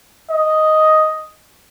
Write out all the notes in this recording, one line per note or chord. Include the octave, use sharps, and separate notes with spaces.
D#5